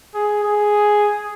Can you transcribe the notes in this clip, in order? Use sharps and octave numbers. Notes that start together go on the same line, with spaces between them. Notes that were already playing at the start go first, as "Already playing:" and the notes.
G#4
G#4